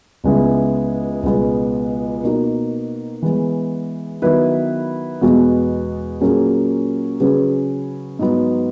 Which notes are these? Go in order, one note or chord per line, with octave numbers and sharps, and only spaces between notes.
C#2 C#3 G#3 B3 E4
C#2 B2 G#3 B3
B2 A#3 D#4 F#4 A#4
E3 G#3 B3
D#3 F#3 B3 E4 B4
E2 B2 G#3 B3 F#4
A#2 F#3 A#3 C#4 G#4
C#3 F#3 C#4 G#4 B4
G#2 F#3 B3